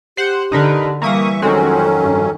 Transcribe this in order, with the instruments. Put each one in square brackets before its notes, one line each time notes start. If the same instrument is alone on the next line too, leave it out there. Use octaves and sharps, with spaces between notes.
[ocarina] G4 [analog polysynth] C5 F#5
[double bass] D3 [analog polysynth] D#4 A#4 B4
[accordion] E3 E5 C#6 [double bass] G3 [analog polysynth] A#3 D#6
[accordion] F2 F#3 C#4 [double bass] D#3 [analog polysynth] G#3 C4 F#4 [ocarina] A4
[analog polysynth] G2